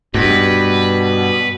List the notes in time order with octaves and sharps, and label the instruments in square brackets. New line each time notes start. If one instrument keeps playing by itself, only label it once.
[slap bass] G2 [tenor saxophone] B2 [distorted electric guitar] B4